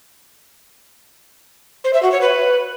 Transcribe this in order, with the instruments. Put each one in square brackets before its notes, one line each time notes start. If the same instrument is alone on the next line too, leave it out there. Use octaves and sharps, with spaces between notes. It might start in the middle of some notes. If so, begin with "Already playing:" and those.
[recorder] C5
E5
F#4
C#5
B4